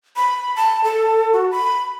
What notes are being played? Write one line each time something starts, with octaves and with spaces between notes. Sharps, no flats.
B5
A5
A4
F#4
B5